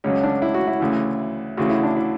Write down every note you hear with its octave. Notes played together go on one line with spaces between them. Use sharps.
C#2 C#3 F#3 C#4
D4
E4
F#4
E4
D2 C#3 E3
D2 C#3 E3 F#4
E4
D4
E4